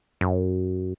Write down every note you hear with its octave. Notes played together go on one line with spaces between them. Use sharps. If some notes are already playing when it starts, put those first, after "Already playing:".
F#2